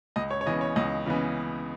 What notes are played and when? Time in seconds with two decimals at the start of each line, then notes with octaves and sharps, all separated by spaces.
0.16 C#2 D#5
0.31 C#5
0.41 C#5
0.46 C#3 E3 B3 D#5
0.61 C#5
0.76 C#2 D#5
1.06 C#3 E3 B3